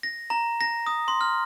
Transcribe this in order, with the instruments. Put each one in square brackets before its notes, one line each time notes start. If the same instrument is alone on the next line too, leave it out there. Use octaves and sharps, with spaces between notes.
[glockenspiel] A#6
A#5
A#6
D#6
C6
F6